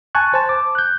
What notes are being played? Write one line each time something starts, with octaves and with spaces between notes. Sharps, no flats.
G#5 A5 C#6 F#6
C5 A5
D6
F#6 G6